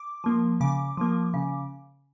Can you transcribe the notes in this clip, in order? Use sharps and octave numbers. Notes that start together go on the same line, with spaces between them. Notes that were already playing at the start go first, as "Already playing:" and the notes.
Already playing: D6
F3 A#3
C#3 D6
F3 A#3
C#3